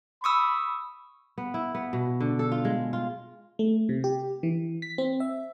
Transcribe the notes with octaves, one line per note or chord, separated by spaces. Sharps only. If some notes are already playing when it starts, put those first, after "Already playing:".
B5 C#6 D#6 E6
B3
E4
B3
B2
D3
A4
F4
G#3
F4
A3
C3
G4
E3
B6
C4
E5